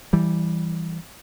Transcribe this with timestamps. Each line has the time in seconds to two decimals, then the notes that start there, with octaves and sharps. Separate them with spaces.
0.13 E3 G3